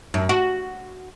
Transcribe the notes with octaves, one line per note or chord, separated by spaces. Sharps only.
F#2
F#4